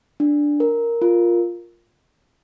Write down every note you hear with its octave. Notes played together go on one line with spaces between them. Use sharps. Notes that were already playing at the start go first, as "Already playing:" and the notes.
D4
A#4
F4